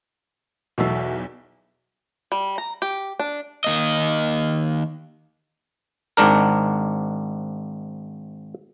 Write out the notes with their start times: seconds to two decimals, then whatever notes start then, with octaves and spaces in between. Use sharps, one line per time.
0.78 B1 E2 B2 F#4 A4 E5
2.32 G3
2.58 A#5
2.82 G4
3.19 D4
3.64 D#3 A#3 D#5
6.17 G#1 G#2 D4 A#4